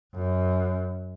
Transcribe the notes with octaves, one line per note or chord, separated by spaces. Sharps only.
F#2